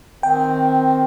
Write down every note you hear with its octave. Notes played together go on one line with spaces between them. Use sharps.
D#3 C4 G5